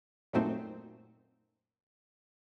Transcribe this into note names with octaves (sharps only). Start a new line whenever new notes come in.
F#2 A#2 F#3 A3 C4 D#4